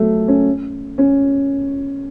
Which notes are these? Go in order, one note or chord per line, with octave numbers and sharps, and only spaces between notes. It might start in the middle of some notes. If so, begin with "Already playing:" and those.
Already playing: F#3 A3
C#4
C#4